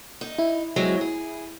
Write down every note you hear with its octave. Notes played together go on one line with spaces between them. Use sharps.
D#4
E4
F#3 G#3 C4
G#4